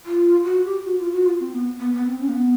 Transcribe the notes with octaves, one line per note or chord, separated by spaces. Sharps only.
F4
F#4
G4
F#4
F4
F#4
F4
C4
B3
B3
B3
C4
C#4
A#3
B3